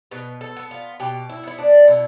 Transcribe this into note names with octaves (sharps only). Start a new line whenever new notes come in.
B2 B4
A4
B3
F4
B2 G4
E4
B3 E4
D4
B2 E4